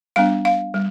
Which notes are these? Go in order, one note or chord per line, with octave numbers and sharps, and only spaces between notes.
G3 B3 D4 F5
F5
G3